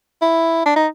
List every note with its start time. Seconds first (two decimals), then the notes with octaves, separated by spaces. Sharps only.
0.22 E4
0.66 D4
0.76 D#4